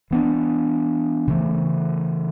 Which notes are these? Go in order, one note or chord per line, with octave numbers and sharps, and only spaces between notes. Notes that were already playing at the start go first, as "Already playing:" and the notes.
E3 B3 D4
C#3 E3 A3